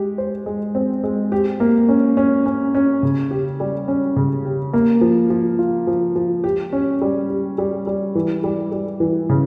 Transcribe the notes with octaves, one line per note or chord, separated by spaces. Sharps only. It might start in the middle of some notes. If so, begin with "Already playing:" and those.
Already playing: G#3 G4
C5
G#3
C4
G#3
G4
A#3
C#4
C#4
C#4
C#4
C#3
G4
G3
C#4
C#3
G4
A#3
F3
F3
F4
F3
F3
G4
C#4
G3
G4
G3
G3
E3
G3
G3
E3
C#3